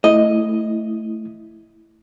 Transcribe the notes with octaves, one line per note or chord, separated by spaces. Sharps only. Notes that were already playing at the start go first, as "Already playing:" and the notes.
A3 E4 D#5